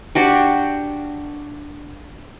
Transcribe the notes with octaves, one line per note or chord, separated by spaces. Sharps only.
D4 F#4 G4